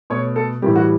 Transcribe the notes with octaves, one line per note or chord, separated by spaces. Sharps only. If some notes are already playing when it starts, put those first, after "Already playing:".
B2 A3 C#5
A4
A2 E3 G3 G4
F#4